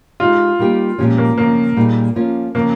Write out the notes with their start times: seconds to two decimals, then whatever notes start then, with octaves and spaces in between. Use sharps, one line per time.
0.20 G#3 D#4 F4 G4
0.59 G3 A#3 D#4 G4
0.98 A#2 F3 G#3 C#4 G4
1.18 A#3
1.38 C#3 F3 A#3 C4
1.77 A#2 G3 A#3 D#4 G#4
2.15 F3 A#3 C#4 F4
2.55 C#3 F3 A#3 C4